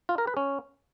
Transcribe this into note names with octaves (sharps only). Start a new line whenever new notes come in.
F4
A#4
B4
C#4